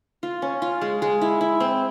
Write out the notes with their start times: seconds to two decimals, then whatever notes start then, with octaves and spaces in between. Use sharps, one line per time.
0.23 F4
0.42 C#4
0.62 F4
0.81 G#3
1.02 G#3
1.21 E4
1.41 E4
1.60 C4